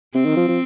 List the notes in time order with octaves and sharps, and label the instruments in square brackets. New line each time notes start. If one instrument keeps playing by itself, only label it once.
[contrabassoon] C3 [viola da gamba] C4
[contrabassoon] D#3
F3
F3